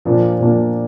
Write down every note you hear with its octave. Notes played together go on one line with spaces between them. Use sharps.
A#2 F3 A#3 D4
A#2 F3 A#3 D4